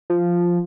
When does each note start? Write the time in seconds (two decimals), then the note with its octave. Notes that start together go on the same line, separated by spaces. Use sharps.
0.10 F3